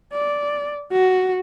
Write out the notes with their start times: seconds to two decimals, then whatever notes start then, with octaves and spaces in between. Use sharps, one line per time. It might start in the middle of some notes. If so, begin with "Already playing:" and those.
0.12 D5
0.92 F#4